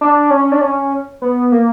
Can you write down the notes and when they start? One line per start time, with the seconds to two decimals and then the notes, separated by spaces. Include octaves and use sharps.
0.01 D4
0.30 C#4
0.52 D4
0.61 C#4
1.22 B3
1.52 A#3